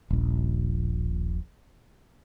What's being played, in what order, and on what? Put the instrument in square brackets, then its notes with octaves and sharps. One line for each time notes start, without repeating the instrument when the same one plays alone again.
[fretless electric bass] D#1 A#1